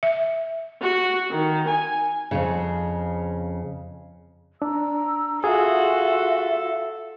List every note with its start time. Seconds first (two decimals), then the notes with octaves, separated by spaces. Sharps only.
0.03 E5
0.81 F#4
1.31 D#3
1.68 G#5
2.31 F2 A2 C#3
4.62 D4 A#5 E6
5.44 F4 F#4 G#4 A4 E5 F5